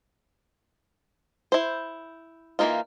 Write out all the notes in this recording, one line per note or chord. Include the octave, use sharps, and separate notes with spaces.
E4 C5
E3 F#3 A#3 D#4 F4